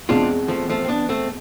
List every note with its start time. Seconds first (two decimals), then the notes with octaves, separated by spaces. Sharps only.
0.09 E2 B2 G#3 C4 D4 F4
0.48 F3 A3
0.69 F3 A3
0.85 C4
0.88 B3 D4
1.09 A3 C4